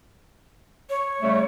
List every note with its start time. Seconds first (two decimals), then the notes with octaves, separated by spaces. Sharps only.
0.90 C#5
1.21 C#3 G3 A3